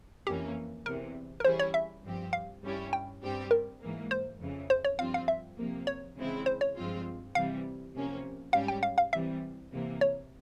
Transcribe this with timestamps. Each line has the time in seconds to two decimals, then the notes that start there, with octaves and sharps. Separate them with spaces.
0.27 F2 E3 A#3 C#4 G4
0.85 E2 C3 E3 A#4
1.40 A#4
1.45 E3 G3 C#4 E4 G#4 C5
1.59 C#5
1.74 E5
2.03 G2 F3 C4 G4
2.33 F5
2.63 G2 G3 C#4 E4 G4
2.93 G5
3.22 G2 G3 C4 G4
3.51 A#4
3.81 G#2 E3 A#3
4.11 C5
4.39 F2 C#3 E3
4.70 C5
4.85 C#5
4.99 G2 F3 C4 F4 F5
5.14 F5
5.28 E5
5.57 C3 F3 A#3
5.87 C#5
6.17 C#3 E3 G#3 C4 E4
6.46 C5
6.61 C#5
6.76 G2 F3 G#3 C4 F4
7.35 C3 E3 G3 F5
7.94 C3 F3 A#3 C#4
8.53 G#2 G3 C#4 G4 F5
8.68 G5
8.83 F5
8.98 F5
9.13 C3 E3 G3 E5
9.72 C3 E3 A#3
10.01 C#5